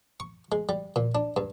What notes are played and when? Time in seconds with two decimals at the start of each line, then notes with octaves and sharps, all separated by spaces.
0.20 C#6
0.52 G#3
0.69 G3
0.96 A#2
1.15 D4
1.37 G2